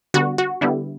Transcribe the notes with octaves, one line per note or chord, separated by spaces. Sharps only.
D3 G3 B3 F#4
F#4
D3 G3 B3 E4